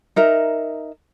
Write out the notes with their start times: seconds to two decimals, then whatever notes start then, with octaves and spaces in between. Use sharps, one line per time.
0.16 D#4 A#4 E5